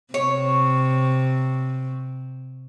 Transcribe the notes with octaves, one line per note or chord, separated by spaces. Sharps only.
C3 C#5